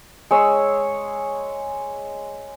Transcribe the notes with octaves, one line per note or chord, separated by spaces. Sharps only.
G#3 C#5 E6